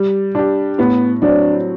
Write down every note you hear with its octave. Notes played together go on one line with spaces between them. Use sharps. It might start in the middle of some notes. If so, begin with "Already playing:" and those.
Already playing: G3
D4 G4
A2 B3
F#3 C4 D4